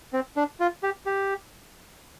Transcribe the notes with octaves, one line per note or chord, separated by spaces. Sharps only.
C4
D4
F4
G4
G4